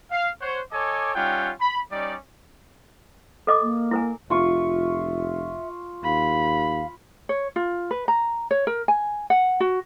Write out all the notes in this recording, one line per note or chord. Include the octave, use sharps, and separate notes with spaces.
F5
C5 C#5 F#5
A4 C#5 D#5 G#5 D6
G3 C#4 D#4 F4 F#5 G5
B5
G3 C#4 D#4 D5
A4 D#5 D6
A#3
E4 A#4 G#5
F1 F4 E5 C#6
D#2 F5 B5
C#5
F4
B4
A#5
C#5
A#4
G#5
F#5
F#4